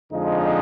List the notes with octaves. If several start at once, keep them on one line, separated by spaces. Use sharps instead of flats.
F2 D3 F3 G#3 D#4